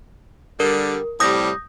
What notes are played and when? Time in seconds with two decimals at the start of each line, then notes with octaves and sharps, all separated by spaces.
0.60 D3 G3 A#4
1.20 A2 C3 G3 D#6 G6 A#6